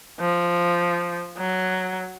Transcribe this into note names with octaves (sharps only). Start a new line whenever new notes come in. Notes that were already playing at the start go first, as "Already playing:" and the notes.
F3
F#3